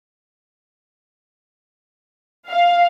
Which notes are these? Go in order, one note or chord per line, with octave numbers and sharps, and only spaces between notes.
F5